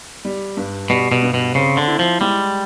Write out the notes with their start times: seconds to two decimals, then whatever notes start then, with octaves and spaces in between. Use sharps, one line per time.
0.25 G3
0.57 G2
0.90 B2 G3
1.12 B2
1.23 G2
1.34 B2
1.55 C#3 C4
1.77 D3
1.87 E4
1.99 F3
2.21 G3 G#3